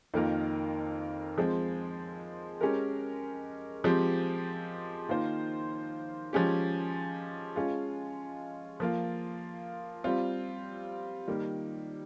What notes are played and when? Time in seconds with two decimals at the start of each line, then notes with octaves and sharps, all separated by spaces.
0.14 F2 D#3 A#3 F4 A#4
1.38 F3 G#3 C4
2.61 G#3 C#4 G4 A#4
3.84 F3 G#3 C4 G4
5.09 D#3 A#3 F4 C5
6.33 F3 G#3 C#4 G4
7.56 G#3 C#4 F4
8.80 F3 A#3 F4
10.04 G3 C4 F4
11.28 D#3 G3 A#3